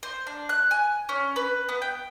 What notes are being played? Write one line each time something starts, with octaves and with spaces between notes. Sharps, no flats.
C5
D4
F#6
G#5
C#4
B4
B3
G5